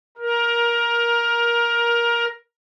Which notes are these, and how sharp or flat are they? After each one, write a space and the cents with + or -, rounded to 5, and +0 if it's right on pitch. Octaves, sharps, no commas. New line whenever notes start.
A#4 +15